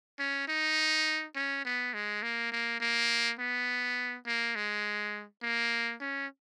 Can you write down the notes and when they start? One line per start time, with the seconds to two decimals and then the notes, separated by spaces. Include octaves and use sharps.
0.19 C#4
0.48 D#4
1.36 C#4
1.65 B3
1.94 G#3
2.23 A#3
2.52 A#3
2.81 A#3
3.39 B3
4.27 A#3
4.56 G#3
5.43 A#3
6.00 C#4